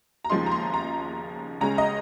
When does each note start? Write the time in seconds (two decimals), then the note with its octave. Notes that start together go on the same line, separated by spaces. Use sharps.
0.25 A#5
0.30 D#2 C#3 F3 G#3 D#4 C6
0.46 A#5
0.52 C6
0.74 A#5
1.61 C#2 C#3 G#3 C#4 A#5
1.78 D#5